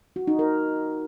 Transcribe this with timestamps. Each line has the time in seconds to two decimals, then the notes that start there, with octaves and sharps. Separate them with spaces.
0.16 F#4
0.27 D#4
0.39 A#4